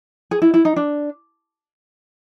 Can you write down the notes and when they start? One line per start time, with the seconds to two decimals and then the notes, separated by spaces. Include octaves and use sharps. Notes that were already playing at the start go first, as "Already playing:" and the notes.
0.31 G#4
0.42 E4
0.54 E4
0.65 D#4
0.76 D4